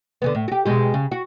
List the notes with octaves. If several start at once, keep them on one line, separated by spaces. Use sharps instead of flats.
D3 F3 B3
A2
F#4 G4
B2 G#3 G4
C#3
F#4